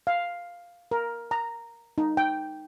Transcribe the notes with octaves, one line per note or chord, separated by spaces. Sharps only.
F5
A#4
A#5
D#4
G5